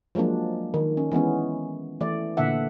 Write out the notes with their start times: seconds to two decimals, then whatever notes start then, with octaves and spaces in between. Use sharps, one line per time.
0.15 F3 F#3 G#3 A#3 D4
0.74 D#3
0.97 C#4
1.12 E3 G#3 B3 C#4
2.01 E3 A3 D5
2.37 A#2 D3 D4 E5 F#5